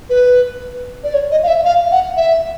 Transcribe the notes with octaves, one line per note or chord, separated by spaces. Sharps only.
B4
D5
C#5
D#5
F5
E5
F5
F#5
E5